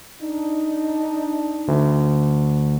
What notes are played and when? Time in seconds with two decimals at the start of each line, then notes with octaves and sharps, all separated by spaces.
0.22 D4 D#4
1.68 D2